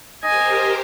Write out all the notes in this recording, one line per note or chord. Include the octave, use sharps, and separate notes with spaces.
G4 A#4 C5 D#5 G#5